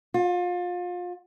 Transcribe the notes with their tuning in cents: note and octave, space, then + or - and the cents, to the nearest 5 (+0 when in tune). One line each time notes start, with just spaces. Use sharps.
F4 +30